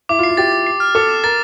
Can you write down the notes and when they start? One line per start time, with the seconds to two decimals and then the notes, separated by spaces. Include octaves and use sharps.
0.09 E4 D6
0.19 F4
0.23 C7
0.29 F4
0.37 G4 A6
0.52 A6
0.66 C7
0.80 F6
0.95 A4 D6
1.09 E7
1.24 A#4 A6